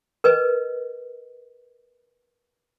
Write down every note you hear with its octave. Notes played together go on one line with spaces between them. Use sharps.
A#4 B4 D#5